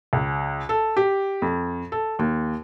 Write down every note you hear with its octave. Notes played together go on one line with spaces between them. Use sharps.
C#2
A4
G4
F2
A4
D#2